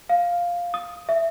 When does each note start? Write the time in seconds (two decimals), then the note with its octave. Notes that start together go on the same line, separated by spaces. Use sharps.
0.09 F5
0.74 D#6
1.09 E5